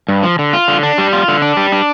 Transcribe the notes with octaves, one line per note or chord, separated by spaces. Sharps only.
G2
F3
D3
F4
D3
D4
G3
F4
D3
D4
G3
D4